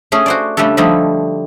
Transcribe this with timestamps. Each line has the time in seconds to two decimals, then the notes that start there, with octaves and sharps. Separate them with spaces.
0.12 A3 C#4 G#4
0.26 F#4 C5 D5
0.57 C#3 G3 A3 D4 G4 A4
0.77 D3 F3 G3 A3 D#4 B5